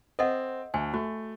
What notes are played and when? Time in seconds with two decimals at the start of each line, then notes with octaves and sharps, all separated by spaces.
0.19 C4 A4 D#5 F#5
0.74 D2 G#5
0.94 A3 F#4